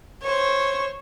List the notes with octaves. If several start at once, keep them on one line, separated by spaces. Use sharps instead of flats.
C5 C#5